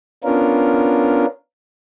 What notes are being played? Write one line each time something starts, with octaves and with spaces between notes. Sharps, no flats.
B3 C#4 D4 F4 A#4